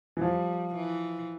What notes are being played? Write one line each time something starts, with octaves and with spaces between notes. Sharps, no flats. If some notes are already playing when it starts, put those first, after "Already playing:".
E3
F3 G3
E3